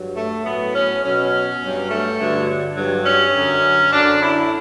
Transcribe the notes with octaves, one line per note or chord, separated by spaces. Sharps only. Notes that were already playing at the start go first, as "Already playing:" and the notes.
Already playing: G2 F#3
A3
A2 F#3 B3
C#4
B2 F#3 C#4
G2 F#3
A3
G2 D3 F#3
G2 F#3
C#4
F#2 D3 F#3
F#2 D3 F#3 D4
E4